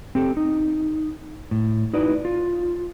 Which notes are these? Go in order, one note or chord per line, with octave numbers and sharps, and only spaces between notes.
C4 G4 A4
D#4
A2
D#4 E4 F#4 B4 D5 D#5
F4